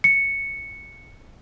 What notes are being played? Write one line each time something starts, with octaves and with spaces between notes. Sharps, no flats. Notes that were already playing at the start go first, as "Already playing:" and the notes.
C#7